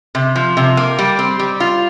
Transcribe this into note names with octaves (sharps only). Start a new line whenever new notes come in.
C3
F3
C3
A#3
G3
C4
G3
F4